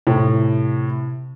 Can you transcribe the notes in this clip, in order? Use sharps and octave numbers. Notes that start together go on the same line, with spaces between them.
A2 C3